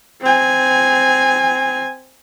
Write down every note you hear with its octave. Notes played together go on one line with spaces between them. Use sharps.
C4 G#5